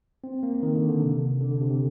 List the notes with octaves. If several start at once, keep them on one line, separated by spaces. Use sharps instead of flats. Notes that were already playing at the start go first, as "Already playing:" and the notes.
C4
A#3
D#3
D3
D3
C3
D3
D3
C3
C3